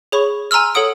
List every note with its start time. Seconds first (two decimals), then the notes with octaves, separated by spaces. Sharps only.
0.12 G#4 C#5 B5 C#6
0.51 G#5 A#5 C6 E6 F6
0.75 A4 C#5 F#5 D#6 D7